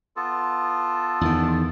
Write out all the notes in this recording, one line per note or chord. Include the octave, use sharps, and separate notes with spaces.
B3 F4 A4
E2 D#3